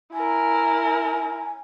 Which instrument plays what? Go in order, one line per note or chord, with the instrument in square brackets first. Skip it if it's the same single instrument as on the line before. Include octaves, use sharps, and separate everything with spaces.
[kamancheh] E4 A#4 [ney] G#5